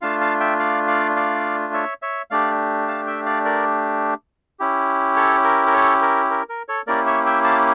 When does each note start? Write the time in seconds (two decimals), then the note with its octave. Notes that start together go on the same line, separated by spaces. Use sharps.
0.02 A3 D4 F4 F5 A5
0.21 F5 A5
0.40 E5 G5
0.59 D5 F5
0.87 D5 F5
1.16 D5 F5
1.73 C#5 E5
2.02 C#5 E5
2.30 A3 D4 G4 D5 F5
2.88 F5 A5
3.07 E5 G5
3.26 D5 F5
3.45 A#4 D5
4.59 C#4 E4 G4
5.16 A4 C#5
5.44 A#4
5.67 A#4
5.74 A4 C#5
6.02 A#4
6.30 A#4
6.49 A#4
6.68 A4 C#5
6.87 A#3 C#4 E4 G4 A#4 D5
7.06 C#5 E5
7.26 E5 G5
7.44 F5 A5